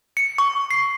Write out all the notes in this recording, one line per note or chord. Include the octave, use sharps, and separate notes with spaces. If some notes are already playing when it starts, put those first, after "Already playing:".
C#7
C#6
C7